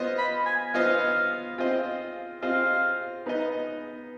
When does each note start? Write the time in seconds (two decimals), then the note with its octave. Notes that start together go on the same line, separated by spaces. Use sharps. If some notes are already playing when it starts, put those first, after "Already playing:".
Already playing: B3 F4 C5 D#5
0.18 B5
0.46 G#5
0.74 B3 F4 C5 D#5 F5
1.58 C4 F4 C5 D#5
2.42 C4 F4 C5 D#5 F5
3.26 B3 D#4 B4 D#5